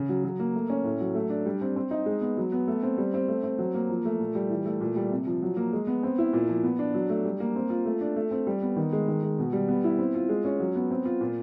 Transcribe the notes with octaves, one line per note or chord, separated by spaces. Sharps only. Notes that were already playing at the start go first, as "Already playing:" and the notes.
Already playing: C#3
F#3
F#3
A#3
A3
C#4
A2
F#3
A3
D4
G3
C4
C4
D#4
G#3
B3
F#3
B3
A3
C4
G3
C4
A3
C4
F#3
A#3
F3
A3
A#2
G3
E3
A3
A#2
G3
C3
F3
F#3
A#3
G#3
B3
C4
E4
A#2
F3
B3
D4
F#3
A3
G3
A#3
C4
F4
A3
D4
A3
C4
G3
B3
D#3
G#3
D#3
G#3
B2
G3
B3
E4
C4
F4
G#3
C#4
F#3
B3
C4
F4
A#2